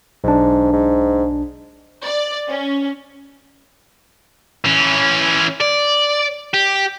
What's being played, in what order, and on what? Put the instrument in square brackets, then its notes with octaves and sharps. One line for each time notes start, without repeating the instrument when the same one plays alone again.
[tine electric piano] B1 D4 [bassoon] G#2
[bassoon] G#2
[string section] D5
C#4
[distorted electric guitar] E3 C#4
D5
G4